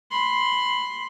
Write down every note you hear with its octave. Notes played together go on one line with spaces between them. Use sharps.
B5 C6